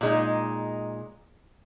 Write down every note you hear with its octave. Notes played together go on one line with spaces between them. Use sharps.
A#2 G#3 D#4